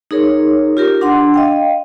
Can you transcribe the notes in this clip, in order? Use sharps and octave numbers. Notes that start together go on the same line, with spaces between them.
D#4 G#4 A#4 C#5
F4 G4 A#4
D4 F#5 C6
D#5 F5 G5